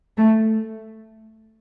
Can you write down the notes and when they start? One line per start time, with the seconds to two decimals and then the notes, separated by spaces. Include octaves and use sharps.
0.17 A3